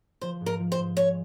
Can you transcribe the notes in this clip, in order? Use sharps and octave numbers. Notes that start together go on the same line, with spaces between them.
F3 C5
G#2
A#4
F3
C5
G#2
G#3 C#5